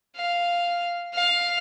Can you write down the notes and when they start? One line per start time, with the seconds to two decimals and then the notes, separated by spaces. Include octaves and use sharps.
0.16 F5
1.14 F5